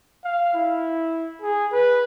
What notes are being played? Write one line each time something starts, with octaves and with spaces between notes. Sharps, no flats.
F5
E4
G#4
B4